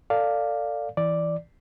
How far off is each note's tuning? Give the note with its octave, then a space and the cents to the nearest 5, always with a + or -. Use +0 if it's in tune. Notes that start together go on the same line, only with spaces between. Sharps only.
A4 +25 D5 +0 F5 +0
E3 +0 D5 +0